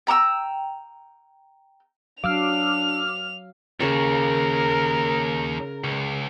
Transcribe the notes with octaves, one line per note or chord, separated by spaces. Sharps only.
G5 A#5 D6 E6
F#3 D4 F5 D6 E6 F6 F7
D#2 C#3 A#4 C#6
C#2